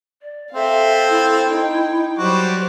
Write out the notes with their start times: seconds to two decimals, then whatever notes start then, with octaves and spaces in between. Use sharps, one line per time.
0.22 D5
0.54 C4 A4 E5 F5
1.09 E4
1.49 D#4 G5
2.18 F#3 G3 F#4 C5 D6